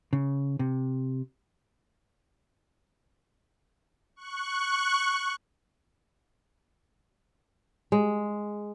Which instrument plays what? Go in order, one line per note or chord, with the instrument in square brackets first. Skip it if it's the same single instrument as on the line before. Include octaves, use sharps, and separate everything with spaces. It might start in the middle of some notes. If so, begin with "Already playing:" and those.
[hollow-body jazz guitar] C#3
C3
[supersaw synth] C#6 F#6
[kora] G#3